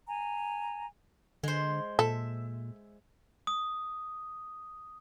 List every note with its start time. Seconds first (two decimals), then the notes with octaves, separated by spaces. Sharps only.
0.09 G#5 A#5
1.43 D3 G#3 C5
1.99 A#2 A4 E5
3.47 D#6